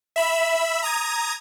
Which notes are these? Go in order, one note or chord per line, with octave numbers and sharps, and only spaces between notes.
E5 B5 E6
A#5 D#6 G#6